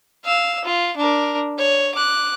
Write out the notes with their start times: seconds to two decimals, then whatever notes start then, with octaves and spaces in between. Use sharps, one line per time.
0.25 F5 E6
0.64 F4
0.97 D4 A#4
1.58 C#5
1.95 D6 F#6